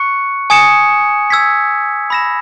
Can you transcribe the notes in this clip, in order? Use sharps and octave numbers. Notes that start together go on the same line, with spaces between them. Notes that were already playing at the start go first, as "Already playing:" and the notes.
Already playing: C#6 F#6 C#7
G#5 D#6 G#6 C#7 E7
E6 G#6 B6
B5 E6 A#6 E7